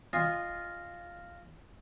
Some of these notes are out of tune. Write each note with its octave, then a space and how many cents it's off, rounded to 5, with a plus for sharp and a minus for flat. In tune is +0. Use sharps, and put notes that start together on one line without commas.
F4 +0 D#5 -15 G#5 -25